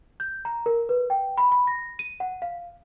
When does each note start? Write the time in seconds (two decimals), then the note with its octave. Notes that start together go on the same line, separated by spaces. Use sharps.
0.20 G6
0.45 A#5
0.66 A#4
0.89 B4
1.10 G5
1.38 B5
1.52 B5
1.67 A#6
1.99 D#7
2.20 F#5
2.42 F5